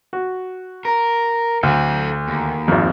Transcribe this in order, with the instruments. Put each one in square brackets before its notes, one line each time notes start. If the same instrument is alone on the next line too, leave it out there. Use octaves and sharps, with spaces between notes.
[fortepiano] F#4
[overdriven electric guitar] A#4
[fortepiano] D2 [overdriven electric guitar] A4 F5
[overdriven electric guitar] D#2
[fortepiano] G#1 F2